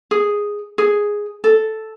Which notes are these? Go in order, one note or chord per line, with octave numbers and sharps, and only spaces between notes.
G#4
G#4
A4